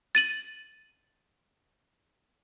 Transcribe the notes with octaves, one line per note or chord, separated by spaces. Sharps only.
A6 D#7 F#7